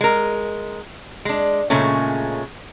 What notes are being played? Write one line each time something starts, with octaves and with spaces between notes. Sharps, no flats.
G#3 A#4
G#3 D4
A#2 C#3 G#3 A3 C#4